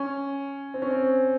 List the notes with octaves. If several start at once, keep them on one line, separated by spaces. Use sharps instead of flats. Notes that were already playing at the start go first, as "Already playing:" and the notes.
Already playing: C#4
C4
C#4
C4